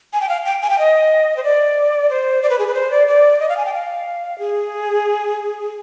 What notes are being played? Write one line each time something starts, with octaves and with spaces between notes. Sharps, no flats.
G#5
G5
F5
G5
G#5
G5
D#5
C5
D5
C5
D5
B4
G#4
B4
C5
D5
D5
D#5
F5
G#5
G5
F5
G#4